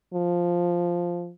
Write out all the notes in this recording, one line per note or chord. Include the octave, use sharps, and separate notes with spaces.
F3